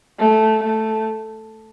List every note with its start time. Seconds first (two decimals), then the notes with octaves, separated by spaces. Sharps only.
0.19 A3
0.64 A3